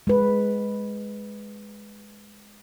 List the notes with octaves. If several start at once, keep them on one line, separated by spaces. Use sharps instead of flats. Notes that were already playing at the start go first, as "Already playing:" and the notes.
G#3 B4